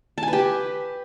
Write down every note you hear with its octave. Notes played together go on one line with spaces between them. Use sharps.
A5
G#5
B4
G4